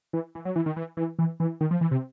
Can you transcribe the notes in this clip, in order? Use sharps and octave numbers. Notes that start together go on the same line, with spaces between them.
E3
E3
F#3
E3
D#3
E3
E3
E3
E3
D#3
F3
E3
C3